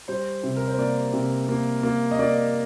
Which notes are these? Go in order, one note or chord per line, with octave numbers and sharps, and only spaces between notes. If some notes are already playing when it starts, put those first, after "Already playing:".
G3 C5
C3
A#4
C5
A#3 D5
C3
A#3
A#3
D#5
A#3 D5